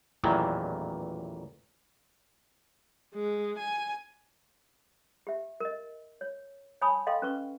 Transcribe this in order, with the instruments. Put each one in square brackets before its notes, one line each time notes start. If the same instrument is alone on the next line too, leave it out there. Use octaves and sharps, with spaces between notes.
[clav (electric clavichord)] A1 E2 A#2 D#3 E3 F#3
[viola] G#3
G#5
[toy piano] G4 E5
A#4 D#5
C#5
C#5 G#5 A5 B5 C#6 D#6
A4 D#5 F5 G5 C6
C#4 B4 C#6